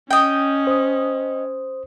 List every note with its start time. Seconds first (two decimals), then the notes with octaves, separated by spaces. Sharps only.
0.11 C#4 D#5 G5
0.67 C5 D#6